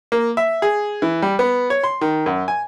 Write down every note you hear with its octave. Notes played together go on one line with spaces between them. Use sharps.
A#3
E5
G#4
E3
G3
B3
C#5
C6
D#3
F#2
G#5